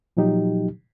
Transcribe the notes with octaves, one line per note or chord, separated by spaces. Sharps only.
A#2 F3 F#3 D#4 G4